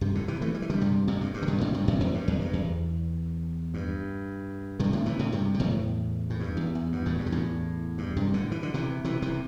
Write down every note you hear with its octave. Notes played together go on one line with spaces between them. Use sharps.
G2 C3
A2 D3
C3 E3
E3 A3
G3
E3
D3 G3
G2 C3
G2 C3
G2
G2
D3
G2 C3
A2 D3
G2 C3
E2 A2
E2 A2
G2
E2
G2
E2
G2
G2 C3
A2 D3
C3 E3
A2 D3
G2 C3
C3
E2 A2
A2
G2
E2
E2
G2
E2 A2
G2
C3
E2 A2
G2
G2 C3
A2 D3
E3
D3
C3 E3
C3 E3
C3 E3